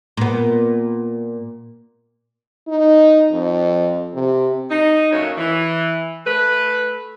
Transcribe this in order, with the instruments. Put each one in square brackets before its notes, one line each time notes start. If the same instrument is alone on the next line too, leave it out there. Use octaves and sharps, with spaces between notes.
[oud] A#2 B3
[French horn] D#4
F2
C3
[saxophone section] D#4
F#2 A#2 A3 A4 C#5
E3
A3 B4